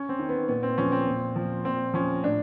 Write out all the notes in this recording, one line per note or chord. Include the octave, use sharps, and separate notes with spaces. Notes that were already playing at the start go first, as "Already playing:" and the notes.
Already playing: C#4
C4
D#3
B3
A#2 B3
C4
F3 C#4
C4
A#2
F3
A#2 C4
F3 C#4
A2 D4